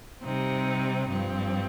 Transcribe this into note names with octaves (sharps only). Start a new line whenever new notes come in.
C3 G3 C4 D#4
G2 F3 C4